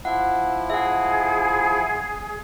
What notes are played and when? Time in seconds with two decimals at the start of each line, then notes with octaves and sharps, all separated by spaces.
0.05 F3 E4 F#5
0.70 G#4 E5 F#5